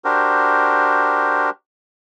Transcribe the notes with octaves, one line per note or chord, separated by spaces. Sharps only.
D4 F#4 G4 A#4 C5